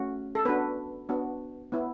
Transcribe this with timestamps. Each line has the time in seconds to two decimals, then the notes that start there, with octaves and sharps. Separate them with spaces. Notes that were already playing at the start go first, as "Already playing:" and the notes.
Already playing: A3 C#4 F#4
0.35 A4
0.45 B3 D4 F#4 B4
1.09 B3 D4 F#4
1.72 B3 E4